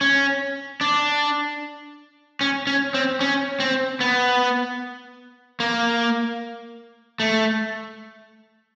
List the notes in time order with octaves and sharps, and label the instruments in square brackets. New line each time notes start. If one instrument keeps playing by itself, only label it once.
[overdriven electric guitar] C#4
D4
C#4
C#4
C4
C#4
C4
B3
A#3
A3